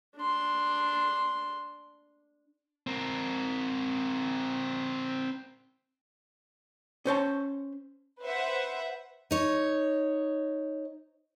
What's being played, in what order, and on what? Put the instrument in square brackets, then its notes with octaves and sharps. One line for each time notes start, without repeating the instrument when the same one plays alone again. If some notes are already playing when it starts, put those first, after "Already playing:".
[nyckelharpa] D4 C6
[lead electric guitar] C4 A#4
[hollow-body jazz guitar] C#4 C5 C#5 A5
[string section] B4 C5 E5 F#5
[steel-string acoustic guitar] D#4 C#5